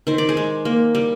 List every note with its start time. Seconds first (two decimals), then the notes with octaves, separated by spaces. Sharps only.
0.07 D#3 C5
0.18 D5
0.29 G#4 C5
0.37 G#3
0.65 A#3
0.95 G3